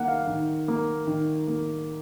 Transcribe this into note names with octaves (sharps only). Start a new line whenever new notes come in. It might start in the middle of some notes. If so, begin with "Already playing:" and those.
Already playing: D#3 A#3 F#5
F5
D#3
A#3
D#3
A#3